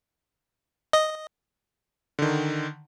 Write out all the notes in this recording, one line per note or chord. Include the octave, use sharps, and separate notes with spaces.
D#5
D3 D#3